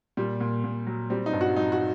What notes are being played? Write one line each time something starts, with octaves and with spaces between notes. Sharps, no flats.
A#2 G3
A#2
A#2
F#3
G3 C4
D#4
G2
F#4
F#3 D#4
F#4